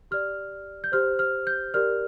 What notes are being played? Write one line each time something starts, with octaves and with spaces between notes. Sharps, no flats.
G4 D5 F6
G6
G4 C5 F6
F6
G6
G4 A#4 D5 F6